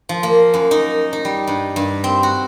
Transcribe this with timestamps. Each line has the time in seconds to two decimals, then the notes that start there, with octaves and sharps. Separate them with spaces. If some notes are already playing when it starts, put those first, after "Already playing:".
0.09 F3
0.23 A#3
0.54 F#2
0.71 D#4
1.13 D#4
1.25 G3
1.47 G2
1.76 G2
2.04 C4
2.23 F#4